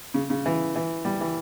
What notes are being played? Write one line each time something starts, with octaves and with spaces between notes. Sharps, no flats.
C#3
C#3
E3
E3
G3
E3